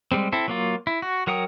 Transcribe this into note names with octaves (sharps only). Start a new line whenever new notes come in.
G3 G#3 C4
C4 E4 A4
F#3 A#3 F4
E4
F#4
F#3 A#4 F#5 G5 D#6